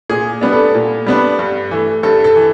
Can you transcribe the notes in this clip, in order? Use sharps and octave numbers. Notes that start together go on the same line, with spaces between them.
A#2 G#4
G3 B3 D4
A4
A#2
G3 B3 D4
G2
E3 A3
G2 A4
A4
E3